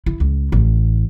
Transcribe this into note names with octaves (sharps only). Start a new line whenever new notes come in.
E4
C#2
A1